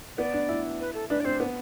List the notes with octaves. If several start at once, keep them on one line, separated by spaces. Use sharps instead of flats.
B3 D5
D4
E4
B4
A4
D4 B4
D5
C4 C5
B3